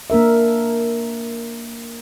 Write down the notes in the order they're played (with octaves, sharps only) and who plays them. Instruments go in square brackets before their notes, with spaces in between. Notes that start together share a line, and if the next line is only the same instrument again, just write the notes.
[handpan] A#3 D4 A#4 E5